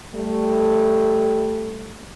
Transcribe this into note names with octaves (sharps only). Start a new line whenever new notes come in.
G3 A3